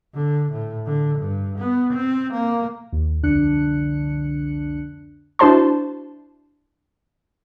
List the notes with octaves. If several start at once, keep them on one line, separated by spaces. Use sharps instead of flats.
D3
A2
D3
G2
B3
C4
A#3
D#2
C2 F2 D3 D4 F#6 C#7
D4 E4 F#4 C5 A5 C6